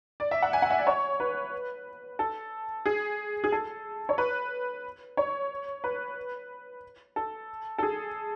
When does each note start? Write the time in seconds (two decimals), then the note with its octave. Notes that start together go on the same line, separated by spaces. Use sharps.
0.20 D5
0.31 E5
0.42 F#5
0.53 G#5
0.62 F#5
0.70 E5
0.78 D5
0.87 C#5
1.20 B4
2.19 A4
2.86 G#4
3.44 G#4
3.52 A4
4.09 C#5
4.18 B4
5.17 C#5
5.84 B4
7.16 A4
7.78 A4
7.83 G#4